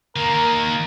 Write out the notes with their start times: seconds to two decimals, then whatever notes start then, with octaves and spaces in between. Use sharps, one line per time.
0.16 D#3 A#3 A#4